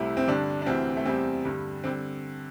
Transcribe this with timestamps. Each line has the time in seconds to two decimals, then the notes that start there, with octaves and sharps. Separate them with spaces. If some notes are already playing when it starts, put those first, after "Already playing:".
Already playing: C2 C3 A3 E4
0.17 C4
0.28 G2 D3 G3 D4
0.62 D4
0.66 D2 C3 E3 C4
0.97 A3
1.05 E2 C3 G3 C4
1.45 G2 D3 G3
1.84 D3 G3 C4